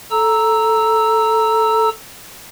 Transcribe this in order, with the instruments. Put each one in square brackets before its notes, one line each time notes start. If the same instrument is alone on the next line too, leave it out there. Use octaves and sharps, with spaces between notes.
[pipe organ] A4 A#5 E6